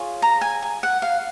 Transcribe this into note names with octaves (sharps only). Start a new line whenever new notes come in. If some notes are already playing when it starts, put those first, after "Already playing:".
Already playing: F4 G#4 C#5
A#5
G#5
G#5
F#5
F5